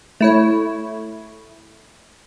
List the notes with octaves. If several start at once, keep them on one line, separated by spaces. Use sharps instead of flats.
A3 E4 C#5